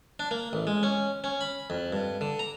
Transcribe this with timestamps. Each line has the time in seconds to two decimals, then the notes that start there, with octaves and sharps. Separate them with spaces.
0.20 D4
0.31 A#3
0.53 A1
0.67 G#3
0.83 C#4
1.24 C#4
1.41 B5
1.70 F2
1.93 G2
2.21 D3
2.39 A#5